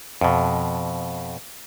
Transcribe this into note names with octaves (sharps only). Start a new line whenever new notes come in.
F2 B2